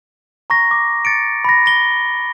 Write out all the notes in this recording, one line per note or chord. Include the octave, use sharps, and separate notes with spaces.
A#5 C#6 A#6
D6
A6 C#7 D7
B5 A#6
A#6 G7